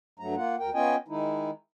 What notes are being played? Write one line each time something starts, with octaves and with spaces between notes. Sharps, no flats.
G2 F#3 A3 A#5
A#3 F4 F#5
D2 A#4 G5
B3 C#4 F4 D#5 G5 G#5
D#3 G#3 D#4 E4